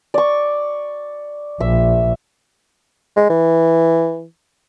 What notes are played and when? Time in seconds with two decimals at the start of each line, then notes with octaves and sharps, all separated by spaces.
0.14 D5 C#6
1.61 A#1 E5
3.16 G#3
3.30 E3